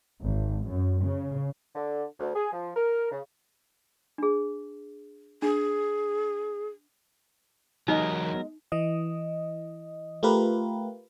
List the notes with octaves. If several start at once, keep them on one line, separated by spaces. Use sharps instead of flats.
G#1
F#2
C#3
D3
D2
G#4
F3
A#4
C#3
D4 G#4
D4 G#4
E2 F#3 G#3 D#4 G4 A#4 D#5
E3 D#5
A3 F4 G4 A#4 B4